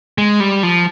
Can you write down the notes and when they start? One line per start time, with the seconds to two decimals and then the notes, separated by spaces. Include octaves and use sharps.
0.18 G#3
0.40 G3
0.63 F3